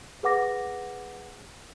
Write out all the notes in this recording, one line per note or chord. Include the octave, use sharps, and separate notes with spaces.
G#4 B4 F#5 D6 A#6